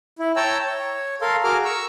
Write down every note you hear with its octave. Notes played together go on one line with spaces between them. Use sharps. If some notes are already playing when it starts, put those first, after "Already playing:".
E4
C#5 G5 A5 A#5 E6
C#5
A4 A#4 F5 C6
F#4 G#4 A#4 D6 F6
A#5 C#6 E6